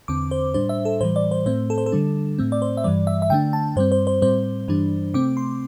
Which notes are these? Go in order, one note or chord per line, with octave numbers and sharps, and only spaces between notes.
E2 D3 C4 D6
C5
A2 G3 D4 C5
E5
A4
A2 E3 G3 C5
D5
C5
A2 A3 C4 C5
A4
C5
A4
D3 G3 D4
A2 A3 C4
D5
C5
E5
G2 E3 G3 D5
E5
E5
D3 A3 D4 G5
A5
G2 G3 C4 C5
C5
C5
A2 G3 C4 C5
G2 E3 G3 D4
C3 A3 C4 D6
C6